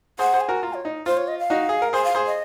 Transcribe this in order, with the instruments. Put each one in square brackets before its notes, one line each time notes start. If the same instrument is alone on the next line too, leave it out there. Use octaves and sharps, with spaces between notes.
[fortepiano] G#4 C5 [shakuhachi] F#5
[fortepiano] G#4 C5
[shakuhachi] G#5
[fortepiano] F#4 A#4
[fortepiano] F4 [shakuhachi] A#5
[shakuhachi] C#5
[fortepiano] D#4
[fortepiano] F4 [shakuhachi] C5
[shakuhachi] C#5
D#5
F5
[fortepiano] D#4 F#4
G#4
A#4
[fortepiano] G#4 C5 [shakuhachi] G#5
[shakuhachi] F5
[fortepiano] G#4 C5
[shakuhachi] D#5